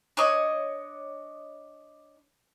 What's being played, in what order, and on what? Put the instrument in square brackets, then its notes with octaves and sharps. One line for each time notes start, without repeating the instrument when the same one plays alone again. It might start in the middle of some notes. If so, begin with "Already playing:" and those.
[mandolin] D4 C#5 D#5